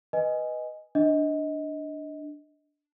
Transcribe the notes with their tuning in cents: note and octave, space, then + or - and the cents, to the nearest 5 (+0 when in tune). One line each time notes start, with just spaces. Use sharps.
B4 +0 D#5 +0 G#5 +0
D4 +0 D#5 +20